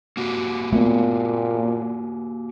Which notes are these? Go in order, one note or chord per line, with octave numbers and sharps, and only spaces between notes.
A#3 F#4 G4
A#2 A3 B3